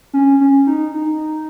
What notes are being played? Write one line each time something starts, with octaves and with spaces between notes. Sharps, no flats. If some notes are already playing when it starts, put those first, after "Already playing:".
C#4
C#4
D#4
D#4